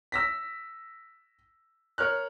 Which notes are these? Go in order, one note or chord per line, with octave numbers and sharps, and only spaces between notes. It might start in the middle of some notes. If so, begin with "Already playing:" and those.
E6 A#6 B6
A#4 C#5 F6 F#6